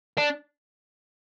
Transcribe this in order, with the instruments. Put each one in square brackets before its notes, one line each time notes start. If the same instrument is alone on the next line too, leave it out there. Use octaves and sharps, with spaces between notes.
[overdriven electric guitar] D4